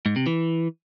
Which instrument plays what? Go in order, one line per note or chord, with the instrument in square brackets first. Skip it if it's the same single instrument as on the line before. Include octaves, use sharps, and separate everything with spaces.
[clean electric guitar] G#2
C3
E3